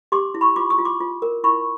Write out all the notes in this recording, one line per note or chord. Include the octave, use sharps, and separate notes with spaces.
G4 C6 D6
E4
B5 C#6
F4 C6 D6
C#6 D#6
F4
C6 D6
F4
A#4
E4 B5 C#6